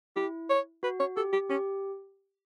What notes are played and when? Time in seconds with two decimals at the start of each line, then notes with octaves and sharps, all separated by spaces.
0.16 E4 G4
0.50 C#5
0.83 F#4 B4
1.00 C#5
1.17 G4 A4
1.33 G4
1.50 C#4 G4